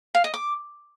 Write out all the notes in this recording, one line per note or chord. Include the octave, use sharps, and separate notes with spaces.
F5
D#5
D6